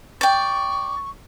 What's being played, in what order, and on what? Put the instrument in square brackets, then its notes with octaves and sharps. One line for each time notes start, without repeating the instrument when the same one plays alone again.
[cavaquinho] D5 G5 [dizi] C#6